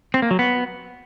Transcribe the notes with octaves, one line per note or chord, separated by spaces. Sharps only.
C4
A#3
F#3
B3